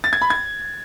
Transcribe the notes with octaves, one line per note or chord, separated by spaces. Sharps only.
A6
G#6
B5
G#6